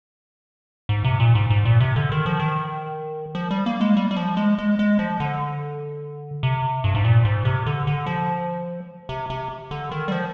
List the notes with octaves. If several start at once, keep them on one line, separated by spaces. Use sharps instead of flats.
G#2
C3
A#2
G#2
G#2
A#2
C3
D3
D#3
F3
D#3
F3
G3
A#3
G#3
G3
G3
F3
G#3
G#3
G#3
F3
D3
C3
G2
G#2
A#2
G#2
C3
D3
D3
F3
C3
C3
D3
D#3
G3
F3